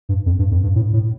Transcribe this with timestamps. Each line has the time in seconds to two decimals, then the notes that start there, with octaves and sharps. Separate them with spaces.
0.09 G2
0.26 F2
0.39 G2
0.51 F2
0.63 G2
0.76 A2
0.93 A2